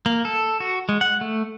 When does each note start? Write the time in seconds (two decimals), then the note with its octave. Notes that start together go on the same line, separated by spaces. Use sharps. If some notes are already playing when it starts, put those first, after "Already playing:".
0.06 A#3
0.25 A4
0.60 F#4
0.89 G#3
1.01 F#5
1.21 A3